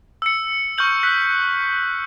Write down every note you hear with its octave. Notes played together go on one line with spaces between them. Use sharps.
E6 C#7
C#6 F6 G6 F#7
F#6 B6